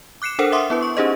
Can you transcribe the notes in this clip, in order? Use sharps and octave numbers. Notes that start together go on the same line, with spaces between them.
D6 F#6 C7 C#7 E7
D4 A4 A#4 C5 F#5
E5 F#5 C6 D6 D#6
B3 E4 B4
C#6
C#4 D#4 G4 G#4 C5 D#5